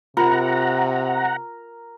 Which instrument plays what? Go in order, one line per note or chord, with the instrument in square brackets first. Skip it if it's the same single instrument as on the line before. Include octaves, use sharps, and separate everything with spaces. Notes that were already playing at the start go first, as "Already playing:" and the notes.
[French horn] C3 [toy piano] F4 [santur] A#4 [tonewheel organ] F#5 A#5